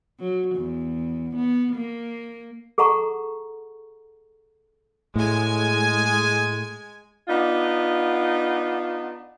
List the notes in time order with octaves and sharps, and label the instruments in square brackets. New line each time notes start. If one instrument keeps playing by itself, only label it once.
[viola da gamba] F#3
E2
B3
A#3
[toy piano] G#4 A4 F#5 A5 A#5 C#6
[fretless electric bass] A2 [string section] G#3 G#5
[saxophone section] B3 D4 D#4 F4